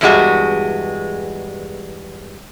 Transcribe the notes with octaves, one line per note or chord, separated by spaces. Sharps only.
E2 G2 G3 G#3 F#4